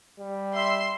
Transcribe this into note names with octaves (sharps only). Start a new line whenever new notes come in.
G3
E5 C6